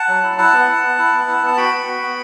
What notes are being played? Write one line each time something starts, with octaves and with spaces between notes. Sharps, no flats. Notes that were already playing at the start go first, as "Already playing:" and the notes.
Already playing: F#5 A5
F#3
E4
E4 F#5 A5
B3
E4
B3
E4
B3
E4
B3 A5
F#4 G5 B5
B3
F#4
B3